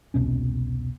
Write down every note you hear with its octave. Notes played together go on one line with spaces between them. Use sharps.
E1 C2 B2 C#4